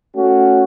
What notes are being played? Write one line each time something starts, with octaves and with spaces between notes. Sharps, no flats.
A3 C#4 F#4